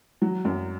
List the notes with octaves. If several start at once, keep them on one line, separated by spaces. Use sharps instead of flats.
F#3
F#2